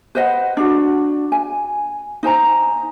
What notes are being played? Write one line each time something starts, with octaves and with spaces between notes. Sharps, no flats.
B4 C5 D#5 F#5
D4 F#4
G#5
D#4 C5 G#5 A#5